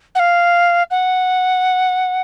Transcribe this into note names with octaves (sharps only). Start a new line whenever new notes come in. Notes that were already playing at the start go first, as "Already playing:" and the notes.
F#5
F5
F#5